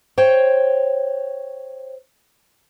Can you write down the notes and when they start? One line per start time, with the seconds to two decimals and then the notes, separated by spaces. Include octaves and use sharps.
0.18 C5 C#5 G5